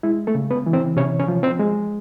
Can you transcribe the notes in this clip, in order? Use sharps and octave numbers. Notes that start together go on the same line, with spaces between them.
G#3 E4
A3 A4
C#3
B3 B4
E3
C4 C5
C3 C#4 C#5
C#4 C#5
F3
C4 C5
G#3